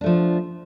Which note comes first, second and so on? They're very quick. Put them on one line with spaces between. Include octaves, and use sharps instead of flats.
D4 A3 F3